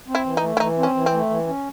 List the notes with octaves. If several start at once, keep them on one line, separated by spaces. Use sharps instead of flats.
C4
E4
E3
D#4
A3
E4
E3 D#4
C4
C#4
E3
C4
A3
E3
C#4